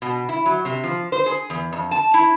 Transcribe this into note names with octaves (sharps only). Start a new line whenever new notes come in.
B2
E4
F#3
C3
F3
C5
G#4
E2
F2
A5
E4